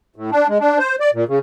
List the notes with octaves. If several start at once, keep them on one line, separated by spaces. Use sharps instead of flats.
A2
D4
G#3
D4
C5
D5
A#2
C#3